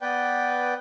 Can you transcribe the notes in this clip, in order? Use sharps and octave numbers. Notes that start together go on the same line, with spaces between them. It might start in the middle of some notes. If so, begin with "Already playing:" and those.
B3 B4 D5 G5